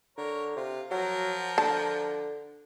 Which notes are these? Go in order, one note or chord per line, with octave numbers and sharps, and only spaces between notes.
D3 A#4 C#5
C3 F4
F3 F#3 A#4
D3 A5